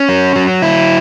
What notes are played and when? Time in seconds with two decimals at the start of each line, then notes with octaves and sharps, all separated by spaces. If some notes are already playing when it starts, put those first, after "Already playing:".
Already playing: C#4
0.09 F#3
0.36 F#3
0.62 E4